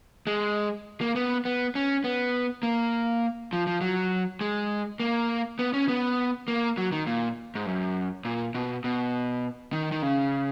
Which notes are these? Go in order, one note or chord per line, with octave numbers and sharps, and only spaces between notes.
G#3
A#3
B3
B3
C#4
B3
A#3
F3
F3
F#3
G#3
A#3
B3
C#4
B3
A#3
F#3
D#3
A#2
G#2
F#2
A#2
B2
B2
D#3
D#3
C#3